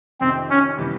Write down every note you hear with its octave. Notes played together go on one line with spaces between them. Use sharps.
F2 C3 D#3 C4
C#4
C3 E3 G3 B3